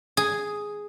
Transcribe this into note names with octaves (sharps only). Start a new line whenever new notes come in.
G#4